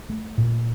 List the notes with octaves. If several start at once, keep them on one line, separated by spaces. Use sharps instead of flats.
A3
A#2